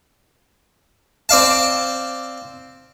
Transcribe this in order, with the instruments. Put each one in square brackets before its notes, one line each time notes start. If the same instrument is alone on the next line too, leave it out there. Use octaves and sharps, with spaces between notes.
[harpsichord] C4 D5 F5 A5